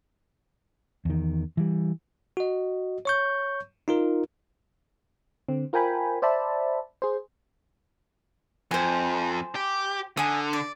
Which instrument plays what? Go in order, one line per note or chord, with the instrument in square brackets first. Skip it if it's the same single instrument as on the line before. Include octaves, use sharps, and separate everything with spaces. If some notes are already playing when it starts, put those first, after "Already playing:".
[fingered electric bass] E2 D#3
E3 G3
[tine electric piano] F#4 D#5
C#5 C#6 G6
D#4 F4 A#4
[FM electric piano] D3 C4
F4 A#4 C5 G5 G#5 B5
C5 D5 E5 A5 B5
G#4 C5
[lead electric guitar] F2 [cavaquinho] C5 G#5
[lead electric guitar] G4
[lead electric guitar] D3 [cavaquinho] G#5 D#6
[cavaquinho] D5